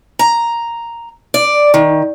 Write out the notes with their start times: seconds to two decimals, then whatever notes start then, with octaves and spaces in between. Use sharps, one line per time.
0.19 A#5
1.34 D5
1.74 D#3